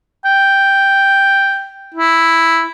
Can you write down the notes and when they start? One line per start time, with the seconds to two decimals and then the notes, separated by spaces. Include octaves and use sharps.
0.25 G5
1.94 E4